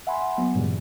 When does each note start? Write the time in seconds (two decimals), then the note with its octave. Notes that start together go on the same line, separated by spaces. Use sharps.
0.07 E5 F#5 G#5 B5 C6
0.38 F#3 B3
0.54 G2 A#2 C#3 E3 F#3 G3